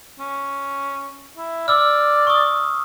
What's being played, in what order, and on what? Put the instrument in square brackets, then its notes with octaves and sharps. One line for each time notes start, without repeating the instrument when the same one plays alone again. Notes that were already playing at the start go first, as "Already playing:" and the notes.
[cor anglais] C#4
E4
[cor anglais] D5 [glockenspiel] D6 E6 F6
[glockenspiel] C#6 D#6